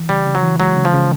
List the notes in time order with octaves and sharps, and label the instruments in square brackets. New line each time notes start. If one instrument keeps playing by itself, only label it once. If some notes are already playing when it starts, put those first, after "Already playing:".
Already playing: [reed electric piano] E3
[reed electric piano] C#3 [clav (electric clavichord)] G3
[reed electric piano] C#3
[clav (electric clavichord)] F#3
[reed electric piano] E3
[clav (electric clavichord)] F#3 [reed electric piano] G#3
[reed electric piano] C#3
[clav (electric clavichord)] F3
[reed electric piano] C#3